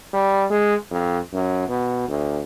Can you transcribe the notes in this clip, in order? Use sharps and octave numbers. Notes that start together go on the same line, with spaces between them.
G3
G#3
F2
F#2
B2
D2